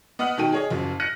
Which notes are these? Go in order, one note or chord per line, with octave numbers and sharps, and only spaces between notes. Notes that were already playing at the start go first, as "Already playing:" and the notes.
B3 D#5 F#5 D#6 F6 F#7
B2 D#3 D#4 A4 G5 D#7
G#4 C#5 D#5
F#1 F#2 F3
F6 F#6 A#6 C#7 D#7